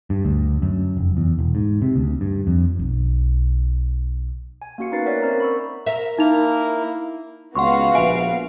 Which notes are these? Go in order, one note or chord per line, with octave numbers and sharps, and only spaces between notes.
G2
D2
F#2
F1
E2
E1
G#2
C3
D2
G2
F2
B1
G#5
A#3 C#4 F#4 F5 C#7
B3 D#4 A#4 B4 A6 C7
A#4 B4 C#5 D5 E5 F#5
C4 C#4 A#4 C5 E5 A#5
B5 C#6 E6
A#4 E5
A#3 D#4 E4 F7
C#2 B3 F#4 F5 F#5 C6 C#6
A#1 E5 G#5 D7